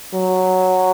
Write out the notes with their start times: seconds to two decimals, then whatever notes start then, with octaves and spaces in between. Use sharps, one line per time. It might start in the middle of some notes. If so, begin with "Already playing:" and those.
0.14 F#3